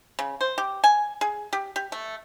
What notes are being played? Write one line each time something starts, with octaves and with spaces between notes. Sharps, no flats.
C#3
C5
G4
G#5
G#4
G4
G4
A3